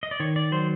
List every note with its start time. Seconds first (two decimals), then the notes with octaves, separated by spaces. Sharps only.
0.03 D#5
0.11 D5
0.20 D#3 C#5
0.36 D5
0.52 F#3 C5